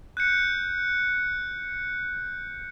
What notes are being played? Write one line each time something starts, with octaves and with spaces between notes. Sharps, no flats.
F#6 G6 C#7